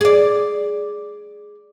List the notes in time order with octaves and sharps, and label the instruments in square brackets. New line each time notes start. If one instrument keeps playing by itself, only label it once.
[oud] G#4 D5